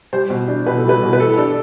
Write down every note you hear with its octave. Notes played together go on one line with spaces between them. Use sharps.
G3 C5
B2
D4
B2 B4
A4
G3 B4
B2
B4
E3 A4
D4 A4